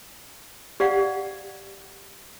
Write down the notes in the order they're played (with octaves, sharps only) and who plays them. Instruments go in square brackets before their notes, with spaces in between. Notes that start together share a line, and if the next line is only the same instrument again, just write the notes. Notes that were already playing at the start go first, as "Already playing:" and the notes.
[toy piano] G4 D5 F5 F#5